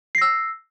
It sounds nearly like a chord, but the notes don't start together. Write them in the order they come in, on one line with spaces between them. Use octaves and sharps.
C7 A#6 E6